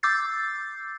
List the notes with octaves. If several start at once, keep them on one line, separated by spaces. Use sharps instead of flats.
D6 E6 G6 A6 C7